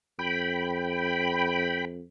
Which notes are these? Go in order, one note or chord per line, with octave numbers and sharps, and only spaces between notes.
F2 G5 B5